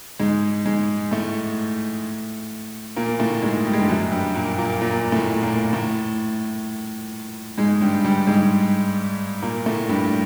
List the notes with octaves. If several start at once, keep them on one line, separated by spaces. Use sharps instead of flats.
G#2 G#3
G#2 G#3
A2 A3
A#2 A#3
A2 A3
G#2 G#3
G3
G#3
G2 G3
F#2 F#3
G2 G3
A#2 A#3
A#2 A#3
A#2 A#3
A2 A3
A#2 A#3
A2 A3
G#2 G#3
G2 G3
G2 G3
G#2 G#3
A#2 A#3
A2 A3
G2 G3